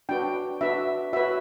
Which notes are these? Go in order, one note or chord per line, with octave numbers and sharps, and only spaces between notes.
D4 F#4 B4 G5
D4 F#4 B4 E5
F#4 B4 E5